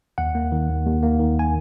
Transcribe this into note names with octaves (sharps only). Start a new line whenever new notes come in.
D#2 F#5
A#3
D#3
D#2
D#2
A#3
D#3
G#5